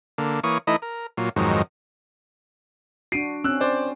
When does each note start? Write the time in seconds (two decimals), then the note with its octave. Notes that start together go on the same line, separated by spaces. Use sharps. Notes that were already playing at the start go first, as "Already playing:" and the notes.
0.18 D3 A#3
0.43 E3 A#3 C#5 C#6 D#6
0.67 E3 A3 D#4 E4 D#5
0.82 A#4
1.18 A#2 F#3 F4
1.36 F2 G#2 D#3 F#3
3.12 D4 F#4 C7 D7 D#7
3.44 C4 C#4 E6 F#6
3.60 C5 D5